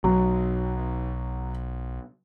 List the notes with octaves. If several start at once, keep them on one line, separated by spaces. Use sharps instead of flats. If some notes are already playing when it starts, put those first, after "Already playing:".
B1 F#3